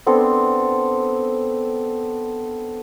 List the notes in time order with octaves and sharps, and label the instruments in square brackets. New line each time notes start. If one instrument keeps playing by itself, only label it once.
[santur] B3 C4 D4 A4